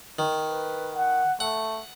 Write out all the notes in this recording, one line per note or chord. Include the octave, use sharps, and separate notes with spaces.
D#3
B4
F#5
A3 F#5